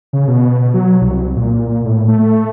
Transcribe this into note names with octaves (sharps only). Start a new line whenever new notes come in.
C#3
B2
F#3
C2
A#2
A#2
A2
A3